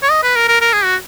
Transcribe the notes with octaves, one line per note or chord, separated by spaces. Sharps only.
C#5
D#5
B4
A#4
A#4
A#4
G#4
F#4